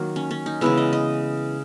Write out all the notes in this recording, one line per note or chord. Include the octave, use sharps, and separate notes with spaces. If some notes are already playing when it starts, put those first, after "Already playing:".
Already playing: D#3 F#3 A#3
C#4
C#4
D#4
C#3 E3 G#3 B3 E4
D#5
D#5